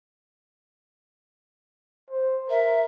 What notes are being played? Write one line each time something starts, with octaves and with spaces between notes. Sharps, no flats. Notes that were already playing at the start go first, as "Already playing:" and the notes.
C5
A#4 E5